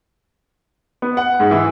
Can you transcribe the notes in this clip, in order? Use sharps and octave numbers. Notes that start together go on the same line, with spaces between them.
B3
F#5
G#2
E3